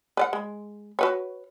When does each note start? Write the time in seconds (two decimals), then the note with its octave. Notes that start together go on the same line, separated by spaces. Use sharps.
0.17 B4 D5 F#5
0.33 G#3
0.99 F#4 B4 C#5